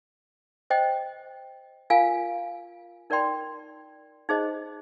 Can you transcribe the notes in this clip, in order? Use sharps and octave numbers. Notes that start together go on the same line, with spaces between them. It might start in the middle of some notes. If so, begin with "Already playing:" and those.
C5 D#5 G5
F4 A#4 F5 G#5
D#4 A#4 D5 G5 C6
D#4 G#4 C5 D#5